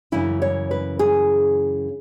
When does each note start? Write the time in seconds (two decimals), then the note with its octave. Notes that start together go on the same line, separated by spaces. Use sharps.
0.12 F#2 C#3 E3 E4
0.42 C#5
0.71 B4
0.99 G#4